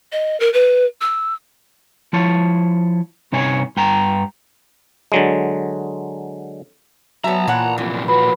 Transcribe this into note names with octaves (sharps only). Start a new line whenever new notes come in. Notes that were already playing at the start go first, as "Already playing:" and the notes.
D#5
A#4
B4
E6
F3 E4 C#5 A5
G2 C3 D#4 C#5 G#5
G2 G5 A#5
D3 F#3 G#3
F#3 B3 E5 A5 A#5
A#2 E3 C#5 F#5
F#2 C3 E3 F3
F3 F#4 B4 B5